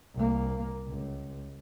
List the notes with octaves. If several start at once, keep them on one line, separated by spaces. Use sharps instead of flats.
C2 A#3
C#2